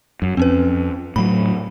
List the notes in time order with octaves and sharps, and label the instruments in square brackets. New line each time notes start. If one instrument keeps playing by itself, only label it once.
[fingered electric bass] F#2
[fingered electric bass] F2 [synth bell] C4 C#4 B4
[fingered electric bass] A2 F#3 [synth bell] B5